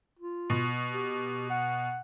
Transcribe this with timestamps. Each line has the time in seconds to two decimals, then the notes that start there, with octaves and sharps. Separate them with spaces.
0.19 F4
0.50 B2
0.91 G4
1.50 F#5